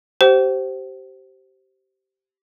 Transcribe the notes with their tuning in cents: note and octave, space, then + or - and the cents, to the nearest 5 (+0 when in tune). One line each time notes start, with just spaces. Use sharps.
G4 -25 C5 +0 G5 -45